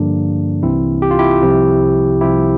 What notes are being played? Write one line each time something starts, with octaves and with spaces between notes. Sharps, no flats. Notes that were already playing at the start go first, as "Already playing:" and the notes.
Already playing: G2 D3 F3 A#3 D4
C2 C3 E3 C4 E4
G4
F4
E4 G4
C2 C3 F3
C2 C3 F3 E4 G4